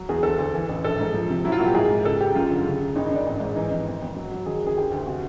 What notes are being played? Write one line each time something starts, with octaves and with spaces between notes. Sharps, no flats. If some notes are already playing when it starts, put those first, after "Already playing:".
Already playing: F#3
E2 G#4
D2 A4
D2
E3
A1
A#1 A4
G#2
F3
C3
F#3 E4
F4
A#2 F#4
G4
G#2 G#4
G#2
C#3 A4
C#3 G4
F#2 F4
D3
C#3
C#3
G#1 D#4
D#4
G#1 D4
A1
G#2
E3 D#4
F2
G#1
G#1
F#3
F#3
D#3 G#4
F#1 G#4
D2 G4
D2
C3 F#4